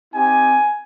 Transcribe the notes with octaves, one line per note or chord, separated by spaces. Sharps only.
C4 D#4 G4 G#5